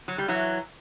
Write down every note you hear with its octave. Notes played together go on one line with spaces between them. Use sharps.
F#3
G3
E3 F#3